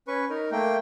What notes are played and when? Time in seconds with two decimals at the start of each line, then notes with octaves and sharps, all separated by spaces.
0.08 C#4 B4 C#6
0.30 D#4 A#4
0.52 A3 A#3 G5